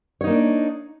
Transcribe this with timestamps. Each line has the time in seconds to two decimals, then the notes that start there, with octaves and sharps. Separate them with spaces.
0.21 C#5
0.24 D#4
0.27 A#3
0.30 D4